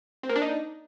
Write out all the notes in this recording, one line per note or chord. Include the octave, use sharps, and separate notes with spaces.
C4
A#3
D4
D#4